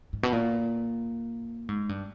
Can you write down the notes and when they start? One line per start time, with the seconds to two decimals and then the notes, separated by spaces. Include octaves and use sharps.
0.13 G#2
0.23 B2
0.33 A#2
1.69 G#2
1.89 G2